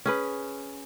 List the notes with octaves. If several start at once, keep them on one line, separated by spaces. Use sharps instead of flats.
C#4 G#4 B4